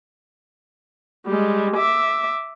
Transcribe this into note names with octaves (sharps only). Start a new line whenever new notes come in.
G3 G#3
E5 D6